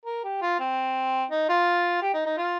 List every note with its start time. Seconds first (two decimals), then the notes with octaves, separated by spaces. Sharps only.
0.06 A#4
0.24 G4
0.42 F4
0.60 C4
1.31 D#4
1.49 F4
2.02 G4
2.14 D#4
2.26 D#4
2.38 F4